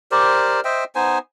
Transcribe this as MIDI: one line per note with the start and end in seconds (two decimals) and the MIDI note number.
0.11 0.60 67
0.11 0.60 70
0.11 0.60 72
0.11 0.60 74
0.65 0.84 72
0.65 0.84 75
0.65 0.84 76
0.65 0.84 79
0.95 1.18 59
0.95 1.18 63
0.95 1.18 72
0.95 1.18 80